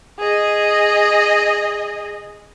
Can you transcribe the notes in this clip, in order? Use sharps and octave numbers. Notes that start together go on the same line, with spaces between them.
G#4 D#5